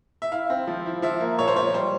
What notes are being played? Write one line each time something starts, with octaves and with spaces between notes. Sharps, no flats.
E5
E4 F5
C4
F3
E4
F3 E5
A#3
A#2 C#5
C5
F3 C#5
G3 C5